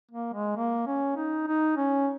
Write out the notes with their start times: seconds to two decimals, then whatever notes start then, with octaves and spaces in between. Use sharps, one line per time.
0.11 A#3
0.34 G#3
0.57 A#3
0.87 C#4
1.17 D#4
1.47 D#4
1.77 C#4